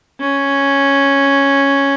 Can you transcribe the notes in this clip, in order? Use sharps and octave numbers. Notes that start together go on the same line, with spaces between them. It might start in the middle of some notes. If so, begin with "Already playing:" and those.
C#4